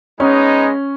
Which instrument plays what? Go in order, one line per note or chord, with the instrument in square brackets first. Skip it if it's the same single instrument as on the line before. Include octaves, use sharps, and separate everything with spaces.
[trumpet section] G#3 B3 D#4 [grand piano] C#4